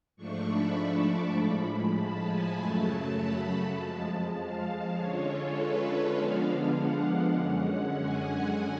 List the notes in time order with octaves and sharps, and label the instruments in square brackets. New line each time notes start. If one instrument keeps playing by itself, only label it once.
[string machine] G#2 F3 A3 D4 C#6
B5
A5
D6
A2 F3 G#3 B5
A5
G#5
F#2 C#3 F#3 A3 A5
B5
F2 F3 G#3 A5
A5
F5
D3 G#3 C#4 F4 C#5
A4
B4
C#5
D3 F3 G#3 B3 D4 F5
F#5
F5
F#2 D3 G#3 C#4 F#5
G#5